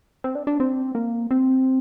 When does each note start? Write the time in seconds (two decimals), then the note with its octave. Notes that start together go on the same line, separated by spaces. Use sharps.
0.24 C4
0.35 D4
0.47 D4
0.60 C4
0.95 A#3
1.31 C4